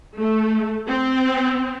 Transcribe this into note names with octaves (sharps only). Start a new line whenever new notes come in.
A3
C4